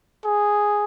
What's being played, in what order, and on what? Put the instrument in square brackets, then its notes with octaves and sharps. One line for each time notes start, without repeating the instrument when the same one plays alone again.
[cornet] G#4